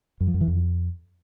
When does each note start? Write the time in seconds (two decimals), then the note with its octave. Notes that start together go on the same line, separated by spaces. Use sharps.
0.21 F#2
0.27 F3
0.34 F#2
0.41 E3
0.48 F2